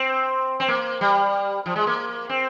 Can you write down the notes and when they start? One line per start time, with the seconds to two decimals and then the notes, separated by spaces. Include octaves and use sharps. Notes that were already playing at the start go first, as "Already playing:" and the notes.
Already playing: C4
0.60 C4
0.68 A#3
1.01 G3
1.66 F3
1.76 G#3
1.87 A#3
2.29 C4